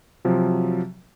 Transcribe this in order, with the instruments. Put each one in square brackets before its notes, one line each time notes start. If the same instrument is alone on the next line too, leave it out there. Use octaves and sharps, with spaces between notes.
[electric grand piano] C3 F3 F#3